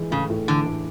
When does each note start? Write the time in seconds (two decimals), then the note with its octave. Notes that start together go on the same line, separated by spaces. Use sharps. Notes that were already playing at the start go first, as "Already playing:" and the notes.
Already playing: E3 G#3
0.11 A2 C#3
0.30 A2
0.48 D3 E3
0.66 A2